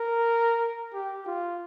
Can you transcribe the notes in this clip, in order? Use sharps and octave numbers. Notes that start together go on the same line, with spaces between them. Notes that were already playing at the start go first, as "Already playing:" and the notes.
Already playing: A#4
G4
F4